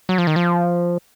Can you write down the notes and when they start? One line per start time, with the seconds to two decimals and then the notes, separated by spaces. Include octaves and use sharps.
0.09 F#3
0.18 F3
0.27 D#3
0.36 F3